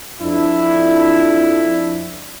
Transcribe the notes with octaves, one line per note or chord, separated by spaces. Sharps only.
F2 D4 E4